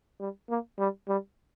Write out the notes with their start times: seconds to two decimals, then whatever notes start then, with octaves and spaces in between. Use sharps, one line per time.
0.20 G3
0.49 A#3
0.79 G3
1.08 G3